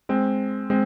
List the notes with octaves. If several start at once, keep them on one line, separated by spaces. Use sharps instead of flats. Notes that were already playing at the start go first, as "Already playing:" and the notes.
G#3 C4
G#3 C4